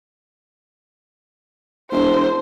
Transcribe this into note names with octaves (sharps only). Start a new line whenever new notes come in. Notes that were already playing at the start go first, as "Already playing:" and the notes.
E1 D4 C5